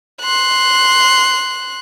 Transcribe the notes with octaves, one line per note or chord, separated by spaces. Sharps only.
C6 F#6